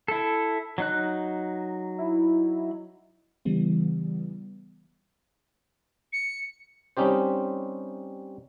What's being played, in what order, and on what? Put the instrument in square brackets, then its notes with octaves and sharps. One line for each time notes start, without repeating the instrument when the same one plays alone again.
[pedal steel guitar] E4 A4
F#3 D#4 F#6
[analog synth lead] E4
[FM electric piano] C#3 E3 G3 B3
[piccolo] C#7
[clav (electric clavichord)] G3 C4 C#4 D#4 G4 C5